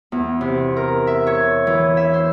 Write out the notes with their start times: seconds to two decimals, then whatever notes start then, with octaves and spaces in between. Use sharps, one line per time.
0.12 E2
0.41 C3
0.77 A#4
1.07 E5
1.27 C#5
1.67 E3
1.97 E5
2.13 C5